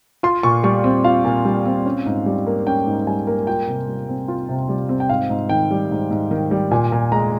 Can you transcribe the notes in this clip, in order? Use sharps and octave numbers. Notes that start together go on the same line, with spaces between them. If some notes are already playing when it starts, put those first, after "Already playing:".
F4 C6
A#2 C#6
G3 C#6
C4
F4 F5
A#2
G3
C4
C#4
G#2
G3
A#3
C#4 G5
G#2
G3 G#5
A#3
F4 G5
C3
G3
C4
F4
C3
G3
C4
G5
G#2 F5
G#2
D#3 G5
G3
G#2
G#2
D#3
G3
A#2 G#5
A#2
G#3 A#5